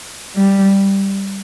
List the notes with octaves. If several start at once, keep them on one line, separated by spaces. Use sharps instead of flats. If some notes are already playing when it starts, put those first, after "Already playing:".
G3